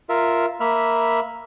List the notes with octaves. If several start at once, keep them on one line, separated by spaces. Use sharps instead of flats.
F4 A#4 E5
A#3 E5 B5 F6